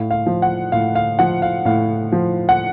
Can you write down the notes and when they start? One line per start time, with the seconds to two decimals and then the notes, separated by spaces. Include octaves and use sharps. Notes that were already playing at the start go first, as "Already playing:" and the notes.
Already playing: A2 F5
0.11 F5
0.26 F3
0.42 F#5
0.72 A2 F5
0.95 F5
1.19 F3 F#5
1.42 F5
1.65 A2 F5
2.12 F3
2.49 F#5